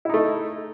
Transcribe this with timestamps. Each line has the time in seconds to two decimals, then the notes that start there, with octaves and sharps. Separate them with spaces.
0.05 E4
0.09 D#4
0.14 A3